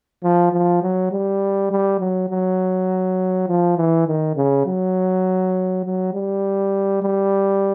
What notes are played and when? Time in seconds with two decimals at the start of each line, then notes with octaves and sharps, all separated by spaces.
0.23 F3
0.53 F3
0.83 F#3
1.12 G3
1.71 G3
2.00 F#3
2.30 F#3
3.48 F3
3.77 E3
4.07 D#3
4.36 C#3
4.66 F#3
5.85 F#3
6.14 G3
7.03 G3